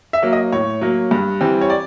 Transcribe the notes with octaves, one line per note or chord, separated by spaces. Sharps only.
E5
F#3 A#3
D#5
A2 C#5
F#3 A#3
G2
E3 G3 C4
C#5
D5